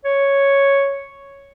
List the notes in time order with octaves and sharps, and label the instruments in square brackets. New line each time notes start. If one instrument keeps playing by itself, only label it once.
[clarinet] C#5